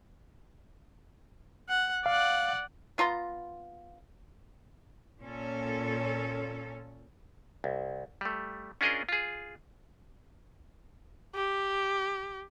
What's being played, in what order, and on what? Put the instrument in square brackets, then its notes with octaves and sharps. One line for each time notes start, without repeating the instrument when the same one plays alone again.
[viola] F#5
[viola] D5 F#5 [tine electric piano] F5
[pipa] B3 F4 A#5 C6
[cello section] A#2 C#4 A4
[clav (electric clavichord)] C2
G3 A3
C#4 D4 F4 G#4 A#4 D#5
F4 G#4
[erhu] G4